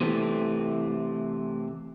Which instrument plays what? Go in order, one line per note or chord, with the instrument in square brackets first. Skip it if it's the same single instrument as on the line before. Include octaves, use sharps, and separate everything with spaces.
[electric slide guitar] C3 E3 A3 C4